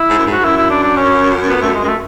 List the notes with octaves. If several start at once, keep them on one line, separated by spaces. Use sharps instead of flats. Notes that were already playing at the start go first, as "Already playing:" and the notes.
Already playing: E4
G#2
F#2
G#2
F#4
G#2
F#2 E4
E4
D4
D4
C#4
B3
A3
G#3
G#3
A3